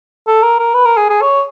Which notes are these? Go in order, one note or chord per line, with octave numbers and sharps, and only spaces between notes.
A4
A#4
A#4
B4
A#4
G#4
G#4
C#5